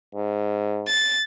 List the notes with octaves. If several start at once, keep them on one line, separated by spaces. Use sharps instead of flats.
G#2
A6